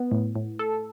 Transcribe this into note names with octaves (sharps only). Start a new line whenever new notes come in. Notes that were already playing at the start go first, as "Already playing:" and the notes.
Already playing: B3
A2
A2
A4